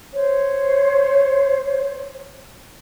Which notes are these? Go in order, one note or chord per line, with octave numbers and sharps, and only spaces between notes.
C5 C#5